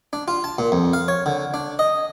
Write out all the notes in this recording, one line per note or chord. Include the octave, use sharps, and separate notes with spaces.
D4
F4
A5
A#2
F2
F5
C#5
D3
D4
D#5